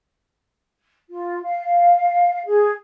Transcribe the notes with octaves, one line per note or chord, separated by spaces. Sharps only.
F4
F5
G#4